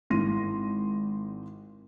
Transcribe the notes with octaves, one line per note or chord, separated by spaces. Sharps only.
G#1 E4 C6 A#6 D#7